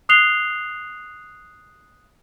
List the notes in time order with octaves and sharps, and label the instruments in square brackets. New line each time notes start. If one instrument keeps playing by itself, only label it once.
[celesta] D#6 F#6 C7 F7 G7